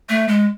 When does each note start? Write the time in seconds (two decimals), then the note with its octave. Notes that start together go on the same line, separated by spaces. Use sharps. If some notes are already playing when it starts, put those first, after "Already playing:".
0.09 A3
0.28 G#3